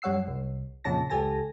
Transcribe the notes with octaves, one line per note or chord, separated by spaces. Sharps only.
F#2 G3 C#5 F#5 E6 C7
C2
F2 A#2 C#3 C#4 A5 A#6
C#2 G4 A4 G#5 A5 A#6